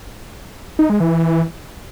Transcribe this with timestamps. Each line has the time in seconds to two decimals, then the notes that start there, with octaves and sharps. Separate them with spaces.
0.79 D#4
0.90 G#3
1.00 E3